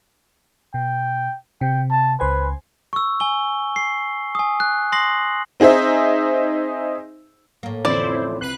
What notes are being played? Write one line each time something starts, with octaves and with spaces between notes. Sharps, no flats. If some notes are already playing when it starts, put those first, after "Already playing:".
B2 G5
C3 G5
A5
C#2 B4 C5 G#5
C#6 E6
G#5 G7
C7
G#5 D#6
F#6
C6 D#6 A#6 C7 F#7
C4 D#4 G#4 C5 E5
A2 A#3
A1 F2 D3 E4 C5 D5
C2 B4 F#6 C7